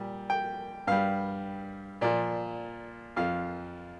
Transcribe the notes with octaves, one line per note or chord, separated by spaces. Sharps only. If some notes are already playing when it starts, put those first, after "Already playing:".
Already playing: A#2 G3
G5
G2 G3 F5
A#2 F3 D5
F2 F3 F5